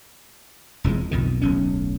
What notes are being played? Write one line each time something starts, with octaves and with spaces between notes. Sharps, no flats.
E1 F2 E3 G#3
B1 F2 B2 D#3
D1 B1 C#4